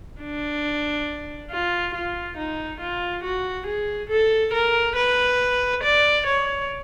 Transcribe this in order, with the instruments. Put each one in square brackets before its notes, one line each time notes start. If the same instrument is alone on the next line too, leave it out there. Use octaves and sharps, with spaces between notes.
[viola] D4
F4
F4
D#4
F4
F#4
G#4
A4
A#4
B4
D5
C#5